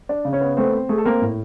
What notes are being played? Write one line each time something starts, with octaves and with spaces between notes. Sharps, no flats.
D4 D5
C#3
C#4 C#5
B3
A3 C4 C5
C4
A3 G#4
A4
A#3 C4 A#4
A2